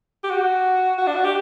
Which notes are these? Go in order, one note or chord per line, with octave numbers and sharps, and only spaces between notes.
G4
F#4
F#4
D4
F#4
G4